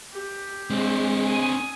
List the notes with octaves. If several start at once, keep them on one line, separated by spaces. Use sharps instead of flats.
G4
G#3 C4 D4
G#5 D#6